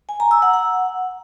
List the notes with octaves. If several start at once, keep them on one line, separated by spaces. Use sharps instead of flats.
G#5
A#5
E6
F#5
F#5